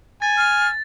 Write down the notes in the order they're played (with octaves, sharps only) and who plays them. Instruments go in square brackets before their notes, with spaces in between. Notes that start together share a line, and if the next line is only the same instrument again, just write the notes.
[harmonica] G#5 [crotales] A6
[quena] F6